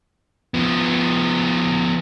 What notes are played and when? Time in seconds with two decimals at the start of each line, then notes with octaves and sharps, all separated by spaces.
0.54 F3 B3